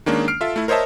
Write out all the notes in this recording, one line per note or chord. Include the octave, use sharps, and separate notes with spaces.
D#3 G#3 A#3 C#4 D4
F6 C7 D7
F4 A4 E5
A3 E4
A#4 C5 C#5 D#5 E5 A5